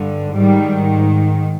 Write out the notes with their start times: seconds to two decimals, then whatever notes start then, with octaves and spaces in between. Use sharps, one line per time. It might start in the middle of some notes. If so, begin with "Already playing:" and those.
Already playing: G2 D3
0.33 G#2 D#3 G3